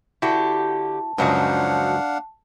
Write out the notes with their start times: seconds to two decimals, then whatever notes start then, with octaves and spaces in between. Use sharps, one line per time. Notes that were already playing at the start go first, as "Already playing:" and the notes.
0.22 D3 E4 F#4 G4 A5
1.18 C#2 F#2 F3 F#3 D4 D#4 F5 F#5